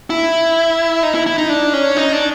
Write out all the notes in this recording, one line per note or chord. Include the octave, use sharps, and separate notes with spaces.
E4
D#4
E4
E4
D#4
D4
C#4
D#4
D4